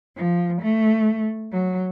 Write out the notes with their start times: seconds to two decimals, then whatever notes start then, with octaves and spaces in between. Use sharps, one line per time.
0.16 F3
0.61 A3
1.51 F#3